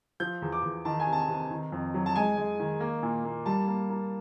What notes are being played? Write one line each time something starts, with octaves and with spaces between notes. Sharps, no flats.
F3 G6
E2
D6
E2
D#3 A5
G#5
C3
A5
C3
D#3
F2
F#3
A5
G#3 G#5
G#3
D#3
A#3
A#2
A#3
G3 A5
A#3
A#3